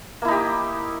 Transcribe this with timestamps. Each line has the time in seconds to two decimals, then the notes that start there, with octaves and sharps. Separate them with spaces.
0.22 A#3
0.25 E4
0.28 D#4
0.31 G4